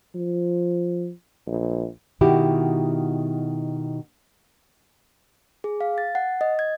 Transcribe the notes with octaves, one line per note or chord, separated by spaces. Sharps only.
F3
A#1
B2 D#3 E4 F#4 G4
G#4
F5
A6
F#5
D#5
G#6